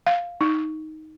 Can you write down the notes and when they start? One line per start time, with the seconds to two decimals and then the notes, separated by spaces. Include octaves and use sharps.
0.07 F5
0.41 D#4